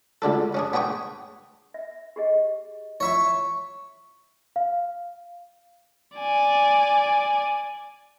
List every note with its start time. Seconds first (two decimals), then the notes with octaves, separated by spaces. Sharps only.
0.22 C#2 D3 D4 A4
0.54 C#4 D4 G#4
0.73 B3 D4 G#4 G5 C#6
1.74 E5
2.16 G4 G#4 D#5
3.00 E4 F4 C#5 E5 C#6
4.56 F5
6.18 D5 G#5